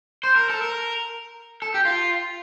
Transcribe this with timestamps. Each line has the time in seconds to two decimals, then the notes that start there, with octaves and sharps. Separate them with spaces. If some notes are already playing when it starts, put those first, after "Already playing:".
0.24 C5
0.36 A#4
0.49 A4
0.62 A#4
1.62 A4
1.74 G4
1.85 F4